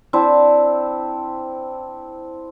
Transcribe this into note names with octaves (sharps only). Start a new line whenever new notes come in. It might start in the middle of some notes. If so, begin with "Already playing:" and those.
C4 D4 E4